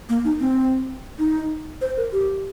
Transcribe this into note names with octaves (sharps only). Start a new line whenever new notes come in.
A#3
D#4
C4
D#4
C5
A#4
G4